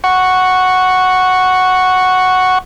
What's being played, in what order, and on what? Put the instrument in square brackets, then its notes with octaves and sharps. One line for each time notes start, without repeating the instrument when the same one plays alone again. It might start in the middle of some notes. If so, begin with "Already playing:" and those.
[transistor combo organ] F#5 C#6